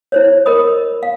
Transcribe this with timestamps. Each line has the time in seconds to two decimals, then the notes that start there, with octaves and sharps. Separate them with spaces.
0.12 E4 C5 C#5
0.46 A#4 D#5 B5 D#6
1.03 F5